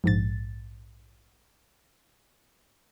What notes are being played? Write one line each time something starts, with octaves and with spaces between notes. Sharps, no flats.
A#1 G#2 A6